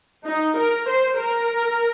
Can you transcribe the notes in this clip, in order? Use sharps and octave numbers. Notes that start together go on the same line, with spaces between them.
D#4
A#4
C5
A#4